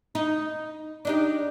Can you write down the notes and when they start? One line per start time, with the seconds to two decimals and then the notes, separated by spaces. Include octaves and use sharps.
0.15 D#4
1.05 D4 D#4 G4